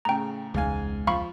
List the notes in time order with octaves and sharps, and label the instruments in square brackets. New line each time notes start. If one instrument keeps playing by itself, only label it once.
[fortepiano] A2 C#3 [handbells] G5 A#5
[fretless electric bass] E1 C#2 [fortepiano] G#2 F5 G#5
[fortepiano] F3 [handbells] F5 B5 C#6